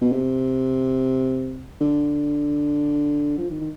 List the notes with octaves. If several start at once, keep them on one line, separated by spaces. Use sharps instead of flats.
B2
C3
D3
F3
D#3
D#3